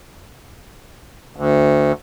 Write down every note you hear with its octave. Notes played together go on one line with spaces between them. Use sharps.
D2